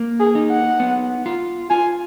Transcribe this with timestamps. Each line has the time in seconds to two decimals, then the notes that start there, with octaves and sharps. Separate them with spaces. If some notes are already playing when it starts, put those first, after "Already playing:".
Already playing: A#3
0.20 G#4
0.35 D#4
0.51 F#5
0.80 B3
1.26 F4
1.70 F4 G#5